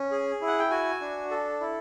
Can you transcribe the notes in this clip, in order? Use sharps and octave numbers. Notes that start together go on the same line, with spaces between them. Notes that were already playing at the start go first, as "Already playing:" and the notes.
Already playing: C#4
G#4
E4
F#5
G5
F#4 G#5
D4
A4
E4